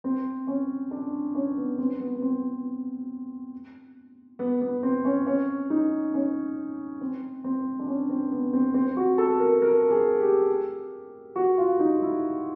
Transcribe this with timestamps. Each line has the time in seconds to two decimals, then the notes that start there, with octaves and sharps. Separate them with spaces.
0.04 C4
0.47 C#4
0.91 D4
1.35 C#4
1.57 B3
1.79 C4
2.00 B3
2.16 B3
2.22 C4
4.39 B3
4.61 B3
4.83 C4
5.05 C#4
5.27 C#4
5.70 D#4
6.14 C#4
7.01 C4
7.44 C4
7.79 D4
7.87 C#4
8.09 C4
8.32 B3
8.53 C4
8.74 C4
8.97 F#4
9.18 A4
9.40 A#4
9.62 A#4
9.91 G#4
10.20 G4
11.36 F#4
11.58 F4
11.79 D#4
12.02 E4